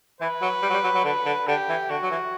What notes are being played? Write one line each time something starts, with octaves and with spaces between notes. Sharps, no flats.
E3 B4
F#3
G3
F#3
G3
F#3
F#3
D3 B4
D3
D3 G4
E3
D3 F#4
F#3
E3